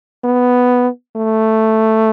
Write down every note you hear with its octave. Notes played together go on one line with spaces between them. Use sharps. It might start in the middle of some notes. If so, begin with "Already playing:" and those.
B3
A3